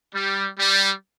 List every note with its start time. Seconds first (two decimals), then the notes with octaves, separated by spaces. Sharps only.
0.15 G3
0.59 G3